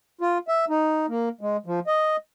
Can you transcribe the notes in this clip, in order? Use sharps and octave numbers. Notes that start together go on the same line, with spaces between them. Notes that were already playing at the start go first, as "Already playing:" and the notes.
F4
E5
D#4
A#3
G#3
F3
D#5